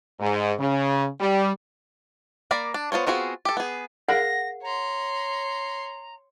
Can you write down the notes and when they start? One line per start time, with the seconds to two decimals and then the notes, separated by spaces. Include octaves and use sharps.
0.20 G#2
0.59 C#3
1.20 G3
2.51 A#3 A#4 D5 B5
2.74 D4
2.92 B3 F4 C5 C#5
3.07 B3 C4 F4 F#4 G#4
3.45 G4 A4
3.57 B3 G#4
4.09 G#4 A#4 F5 F#5 A#6
4.63 C#5 A#5 C6